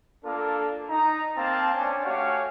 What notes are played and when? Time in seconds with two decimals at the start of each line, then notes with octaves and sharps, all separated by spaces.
0.25 A#3 D4 F4 A4
0.89 D#4 A#5
1.37 A#3 C4 F5 A5
1.74 C#4 D4
2.04 A3 F#4 G4 C#5 F5 G#5